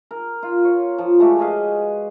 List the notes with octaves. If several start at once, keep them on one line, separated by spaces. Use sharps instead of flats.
A#4
F4
C#5
F3
G#3 A3 F#4 G4
G#4 B4 D#5 F5